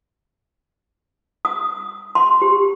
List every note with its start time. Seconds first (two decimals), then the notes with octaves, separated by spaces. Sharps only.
1.45 D#6
2.15 C6
2.42 G4